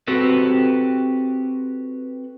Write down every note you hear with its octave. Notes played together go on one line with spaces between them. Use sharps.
C4 F#4 G4 A4 B4